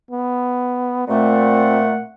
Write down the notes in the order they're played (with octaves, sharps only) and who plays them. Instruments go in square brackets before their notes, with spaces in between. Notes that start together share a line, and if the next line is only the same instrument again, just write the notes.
[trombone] B3
[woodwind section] A#2 A3 [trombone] C4 [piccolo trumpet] F#5